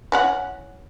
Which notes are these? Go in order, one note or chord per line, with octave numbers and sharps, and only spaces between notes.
E3 C#4 F#5